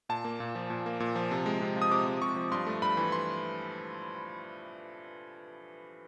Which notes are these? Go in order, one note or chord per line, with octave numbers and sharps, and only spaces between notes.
A#2 A5
A#3
A#2
F3
A#2
A#3
A#2
F3
C3
G#3
C3
F3
D#6
C3 D6
G#3
C3 C#6
F3
G2 C6
A3
G2 B5
E3
C6